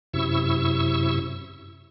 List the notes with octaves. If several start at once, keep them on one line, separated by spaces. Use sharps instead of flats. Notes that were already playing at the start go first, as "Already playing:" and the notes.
F#2 C3 E4 C#6 E6